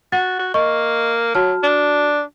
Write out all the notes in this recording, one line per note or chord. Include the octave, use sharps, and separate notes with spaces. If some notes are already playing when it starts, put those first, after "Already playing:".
F#4 F#5 A6
F#4
A#3 D#5 C#6
F#3 F#4 A5 F6
D4